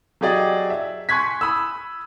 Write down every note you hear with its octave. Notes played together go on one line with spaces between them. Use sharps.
F#3 G4 G#4 D5 D#5
E5
G#5 C6 C#6 F#6 G#6 B6
B5 D#6 E6